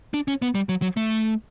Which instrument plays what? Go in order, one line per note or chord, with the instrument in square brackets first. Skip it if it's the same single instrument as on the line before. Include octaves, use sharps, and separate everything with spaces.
[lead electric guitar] D4
C#4
B3
G3
F#3
F#3
A3